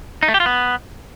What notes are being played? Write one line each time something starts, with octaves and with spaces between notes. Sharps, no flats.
D#4
A3
G4
F4
B3